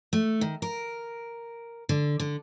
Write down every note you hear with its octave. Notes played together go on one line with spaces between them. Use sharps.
A3
D#3
A#4
D3
D3